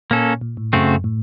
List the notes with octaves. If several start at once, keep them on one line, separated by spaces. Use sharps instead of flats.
A#2 A#3 C#4 A4
A#2
A2
F#2 C#3 A3 C4 F#4
A2